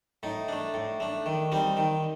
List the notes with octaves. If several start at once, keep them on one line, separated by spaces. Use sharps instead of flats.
A2 D#4
A3 D4
A2
A3 D4
D#3
G3 C4 D#4
D#3